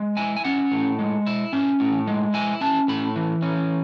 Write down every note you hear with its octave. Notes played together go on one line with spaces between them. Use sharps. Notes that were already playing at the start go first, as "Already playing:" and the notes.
Already playing: G#3
E4 G#5
G#5
C#4 F#5
A2
G#3
E4
C#4
A2
G#3
E4 G#5
C#4 A5
A2 B5
E3
C#4